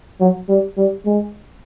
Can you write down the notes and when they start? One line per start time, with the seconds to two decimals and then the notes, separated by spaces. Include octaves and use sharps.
0.21 F#3
0.49 G3
0.77 G3
1.06 G#3